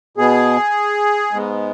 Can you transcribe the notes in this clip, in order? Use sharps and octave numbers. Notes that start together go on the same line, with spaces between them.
B2 B3 G#4
G#2 G#3 B3